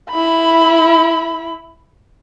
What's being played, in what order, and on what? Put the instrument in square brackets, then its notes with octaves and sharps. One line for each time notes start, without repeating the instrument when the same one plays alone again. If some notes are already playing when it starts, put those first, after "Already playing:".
[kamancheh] E4 B5